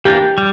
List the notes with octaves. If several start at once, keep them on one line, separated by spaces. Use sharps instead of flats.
E3 A#3 D4 G4
G3